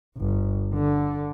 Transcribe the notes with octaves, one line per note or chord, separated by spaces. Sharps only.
G1
D3